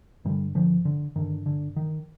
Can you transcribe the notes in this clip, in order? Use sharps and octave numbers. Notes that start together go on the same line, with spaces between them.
G2 D3 D#3 G3
D3 F3
D3
G2 D3 D#3
D3
D#3